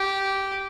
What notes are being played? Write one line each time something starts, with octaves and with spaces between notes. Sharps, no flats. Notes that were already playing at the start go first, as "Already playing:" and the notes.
Already playing: G4